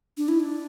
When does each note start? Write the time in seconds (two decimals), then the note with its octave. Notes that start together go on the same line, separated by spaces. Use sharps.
0.17 D4
0.28 E4
0.40 D4